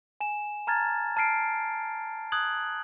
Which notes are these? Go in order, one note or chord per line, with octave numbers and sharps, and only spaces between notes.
G#5 E7
A5 A#5 F6 G#6 A6
A5 F6 C7 D7
D#6 F#6 G#6 F#7